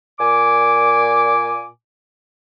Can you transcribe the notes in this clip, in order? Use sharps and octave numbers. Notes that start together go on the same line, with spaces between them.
A#2 G#5 D6